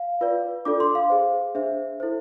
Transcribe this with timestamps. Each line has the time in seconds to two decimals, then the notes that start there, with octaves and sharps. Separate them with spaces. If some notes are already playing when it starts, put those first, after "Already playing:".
Already playing: F5
0.21 F4 B4 D5
0.65 D4 F4 A4 D5 D6
0.80 C6
0.95 F5
1.10 G#4 C5
1.55 D4 G#4 C5 E5
2.00 E4 A4 C5